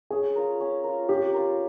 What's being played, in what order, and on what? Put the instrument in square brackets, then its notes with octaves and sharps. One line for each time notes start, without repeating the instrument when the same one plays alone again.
[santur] C#4 [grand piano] G#4
[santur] F4 A#4
C#4
F4 A#4
[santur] C#4 [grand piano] G4
[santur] F4 A#4